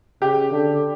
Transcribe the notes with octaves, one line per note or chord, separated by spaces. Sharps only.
C#3 G4
D3